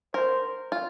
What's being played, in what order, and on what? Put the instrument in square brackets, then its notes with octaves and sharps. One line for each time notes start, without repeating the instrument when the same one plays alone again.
[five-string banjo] A#4 [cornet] C5
[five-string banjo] F4